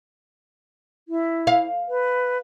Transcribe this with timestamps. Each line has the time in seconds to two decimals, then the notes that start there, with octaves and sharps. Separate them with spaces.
1.08 E4
1.47 F5
1.89 B4